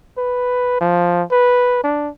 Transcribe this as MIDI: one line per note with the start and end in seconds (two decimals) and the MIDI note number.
0.18 0.78 71
0.81 1.23 53
1.31 1.79 71
1.84 2.10 62